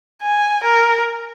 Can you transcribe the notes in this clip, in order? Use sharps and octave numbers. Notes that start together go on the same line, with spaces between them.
G#5
A#4